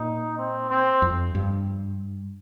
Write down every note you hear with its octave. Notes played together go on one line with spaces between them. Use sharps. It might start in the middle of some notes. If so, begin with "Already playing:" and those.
Already playing: A#2 D#4
C4
C4
F2
G2